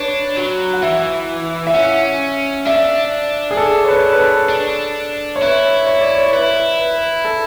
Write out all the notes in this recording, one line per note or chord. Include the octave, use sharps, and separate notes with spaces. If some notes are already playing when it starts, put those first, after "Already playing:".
Already playing: D4 B4 C#5
F#3
F#5
E3 E5
E5
C#4 F#5
D4 E5
G#4
A4
C#5
B4
B4
A4
D4
C#5
E4 B4
C#5
D5
C#5
E4 B4
B4
A4